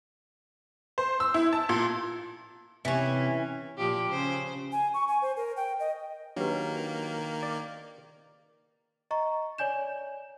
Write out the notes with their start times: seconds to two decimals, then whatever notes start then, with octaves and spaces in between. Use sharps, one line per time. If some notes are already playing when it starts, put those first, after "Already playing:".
0.98 C5
1.20 E6
1.34 E4
1.53 A5
1.69 A#2
2.85 C3 E3 C#4
3.78 A#2 F3 G4
4.09 C#3 C5
4.72 G#5
4.94 C#6
5.08 G#5
5.22 C5
5.37 A#4
5.57 G5
5.80 D#5
6.36 D#3 F#3 A#3 D4 G4 B4
7.43 D5
9.11 D#5 A#5 C#6
9.58 C#5 D5 G#5 G6 E7